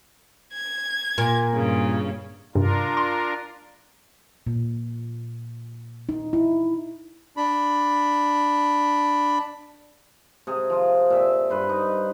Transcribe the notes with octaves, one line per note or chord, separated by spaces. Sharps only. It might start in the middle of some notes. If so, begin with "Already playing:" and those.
G#6
A#2
G2 C#3
G2 C3 D4 F4 A#4
C6
A#2
D#4
E4
D4 B5
C3 G#4
F3 F4
A#2 E5 G5
G2 B4 C5
D#4